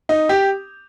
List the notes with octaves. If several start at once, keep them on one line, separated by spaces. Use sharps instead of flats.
D#4
G4